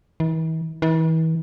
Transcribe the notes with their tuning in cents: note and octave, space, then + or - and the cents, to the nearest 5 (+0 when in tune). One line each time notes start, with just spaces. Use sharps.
E3 -45
E3 -40